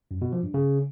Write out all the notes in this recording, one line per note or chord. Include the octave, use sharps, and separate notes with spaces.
F#2
B2
F3
G2
C#3